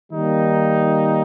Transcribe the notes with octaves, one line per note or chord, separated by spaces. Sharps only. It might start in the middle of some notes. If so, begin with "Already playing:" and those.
D#3 G3 A#3 D#4